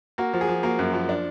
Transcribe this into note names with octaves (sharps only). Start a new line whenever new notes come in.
A#3 F#4
F3
G#4
F3
A#3 F#4
F#2
F3
D4